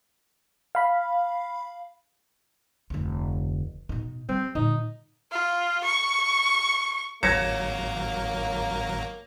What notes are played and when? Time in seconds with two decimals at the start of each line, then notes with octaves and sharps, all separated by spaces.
0.75 F5 B5
2.90 F1 D2
3.89 B2 D#4
4.29 G3 C4
4.55 A#2 D3 D#4
5.32 F4
5.84 C#6
7.23 G#1 F#3 A#3 C#5 A#5 G#6 A#6 C#7